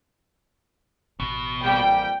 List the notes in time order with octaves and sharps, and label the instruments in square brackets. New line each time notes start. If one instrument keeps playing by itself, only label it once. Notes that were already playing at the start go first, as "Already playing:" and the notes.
[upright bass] A1 [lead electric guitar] B2
[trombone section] F2 A#2 G3 [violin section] G5